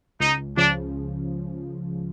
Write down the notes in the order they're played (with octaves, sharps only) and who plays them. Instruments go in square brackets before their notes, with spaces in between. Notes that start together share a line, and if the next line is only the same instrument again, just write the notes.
[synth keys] C#2 [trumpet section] D#4
[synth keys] C#3 F3 [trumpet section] D4